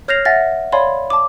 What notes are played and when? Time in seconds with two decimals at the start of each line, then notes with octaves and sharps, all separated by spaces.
0.08 C#5 F6 G6 A#6 C7 F7
0.25 E5 F#5 G#5 A6 A#6
0.72 C#5 D5 F5 G#5 B5 C6
1.10 A5 D6